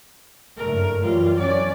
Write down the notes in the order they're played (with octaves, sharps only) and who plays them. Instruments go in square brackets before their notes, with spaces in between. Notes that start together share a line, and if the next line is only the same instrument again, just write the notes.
[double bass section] F#1 G2 A3 [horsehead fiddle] A#4
[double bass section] F#2 E3 G3 [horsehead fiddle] F4
[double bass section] F#3 C#4 [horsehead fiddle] D5